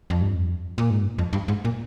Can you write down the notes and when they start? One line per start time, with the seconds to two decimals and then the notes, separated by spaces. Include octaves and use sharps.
0.10 F2
0.21 G2
0.34 F2
0.78 A#2
0.90 G#2
1.02 G2
1.18 F2
1.33 G2
1.48 G#2
1.65 A#2